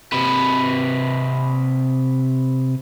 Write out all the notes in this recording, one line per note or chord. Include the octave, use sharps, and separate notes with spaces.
C3 B4